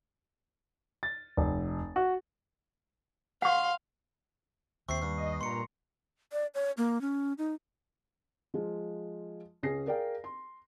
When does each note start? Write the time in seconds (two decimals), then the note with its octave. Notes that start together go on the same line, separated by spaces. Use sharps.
1.03 A6
1.37 F1
1.96 F#4
3.42 F5 F#5 C6 C#6
4.89 D#2 C3 C#6 C7
5.02 G2
5.18 D#5
5.41 A#2 A#5 C6 C#7
6.33 D5
6.54 C#5
6.77 A#3
7.01 C#4
7.38 D#4
8.54 F3 G#3 F4
9.63 C#2 C#4 G#4 A#6 C7
9.87 G#4 A#4 D5 F5 G5
10.24 C6